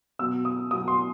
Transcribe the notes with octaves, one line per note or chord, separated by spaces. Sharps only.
B2 F#3 B3 E6
D#6
B2 F#3 B3 D#6
C6